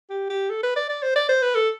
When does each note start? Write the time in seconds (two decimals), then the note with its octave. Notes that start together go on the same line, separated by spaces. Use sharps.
0.09 G4
0.30 G4
0.50 A4
0.63 B4
0.76 D5
0.89 D5
1.03 C5
1.16 D5
1.29 C5
1.42 B4
1.55 A4